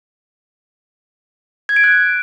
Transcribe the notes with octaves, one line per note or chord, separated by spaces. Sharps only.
G#6
D7
F#6